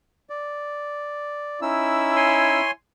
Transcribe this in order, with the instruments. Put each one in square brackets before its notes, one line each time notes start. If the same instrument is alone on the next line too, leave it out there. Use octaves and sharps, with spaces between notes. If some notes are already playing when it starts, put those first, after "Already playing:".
[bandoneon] D5
[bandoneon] C#4 D#4 E6 [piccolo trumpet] E4
[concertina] C#5 G#5 C6